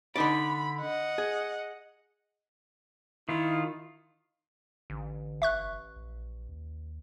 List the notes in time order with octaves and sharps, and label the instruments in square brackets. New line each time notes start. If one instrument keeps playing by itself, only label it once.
[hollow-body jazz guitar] D3 D#4 D5 [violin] B5
[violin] D#5 F#5
[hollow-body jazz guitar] G#4
[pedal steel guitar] D#3 F4 [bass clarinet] E4
[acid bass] A1 [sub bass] D3
[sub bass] F#1 [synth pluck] E5 C#6 F#6
[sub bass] A#1
D#2